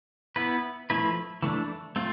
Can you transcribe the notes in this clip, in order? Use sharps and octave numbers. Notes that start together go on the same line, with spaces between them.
B3 E4 B4
F3 A3 E4 B4
E3 A3 D4
A3 C4 F4